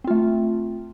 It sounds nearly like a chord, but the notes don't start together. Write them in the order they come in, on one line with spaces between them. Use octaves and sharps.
C4 F4 A3